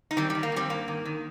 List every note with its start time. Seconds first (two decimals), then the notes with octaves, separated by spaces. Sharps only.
0.11 D#4
0.17 D#3 G3 C4
0.30 G3
0.35 D#3
0.43 A#3
0.52 G2 G3 C4
0.70 G2 A#3
0.88 D#3
1.05 D#3